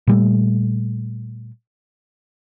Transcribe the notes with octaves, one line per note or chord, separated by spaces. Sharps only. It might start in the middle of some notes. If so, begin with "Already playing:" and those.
A#2 G3 A3